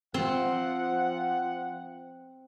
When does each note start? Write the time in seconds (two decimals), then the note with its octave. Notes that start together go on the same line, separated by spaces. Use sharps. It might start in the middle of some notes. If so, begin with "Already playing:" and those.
0.14 F3 C4 F#5